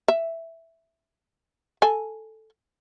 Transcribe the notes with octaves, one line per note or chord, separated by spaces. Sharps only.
E5
A4 G#5